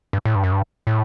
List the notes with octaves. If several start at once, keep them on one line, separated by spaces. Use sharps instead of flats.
G2
A2
G2
F#2
G2
A2